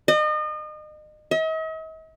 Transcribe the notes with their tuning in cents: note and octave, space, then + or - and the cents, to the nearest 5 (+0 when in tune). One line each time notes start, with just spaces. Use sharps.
D#5 -35
D#5 +45